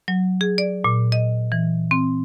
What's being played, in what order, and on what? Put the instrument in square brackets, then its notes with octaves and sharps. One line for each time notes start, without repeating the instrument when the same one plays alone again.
[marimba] F#3
G#4
D5
A#2
D#5
E3
C4